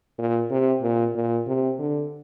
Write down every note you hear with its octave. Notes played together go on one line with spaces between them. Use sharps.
A#2
C3
A#2
A#2
C3
D3